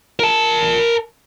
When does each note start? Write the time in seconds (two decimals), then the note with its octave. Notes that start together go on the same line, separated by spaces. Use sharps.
0.19 A#4 A5